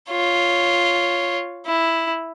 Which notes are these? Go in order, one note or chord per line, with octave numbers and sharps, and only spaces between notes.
F4 C#5
E4